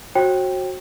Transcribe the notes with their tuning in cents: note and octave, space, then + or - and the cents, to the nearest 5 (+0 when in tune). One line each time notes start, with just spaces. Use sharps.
F#4 +0 C5 +45 G5 +0